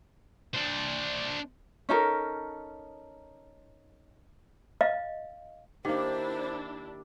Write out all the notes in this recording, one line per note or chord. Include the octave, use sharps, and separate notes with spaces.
D4 C5
C#4 D#4 A4 A#4
D#5 F5
D#3 A#3 D4 E4 G4 C5